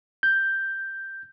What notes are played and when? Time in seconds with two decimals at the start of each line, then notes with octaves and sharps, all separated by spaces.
0.23 G6